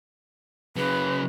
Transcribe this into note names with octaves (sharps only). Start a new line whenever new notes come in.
C#3 F#3 B4